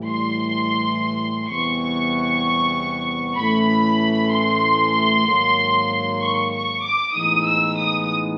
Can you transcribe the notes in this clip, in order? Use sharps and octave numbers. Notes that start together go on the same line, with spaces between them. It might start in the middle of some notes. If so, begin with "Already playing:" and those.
Already playing: A2 E3 G3
C6
E2 C3 E3 G3 B3 C#6
A2 E3 A3 C#4 B5
C6
G#2 D#3 F#3 A#3
C#6
C#6
D6
A2 E3 G#3 B3 D#4 D#6
E6
D#6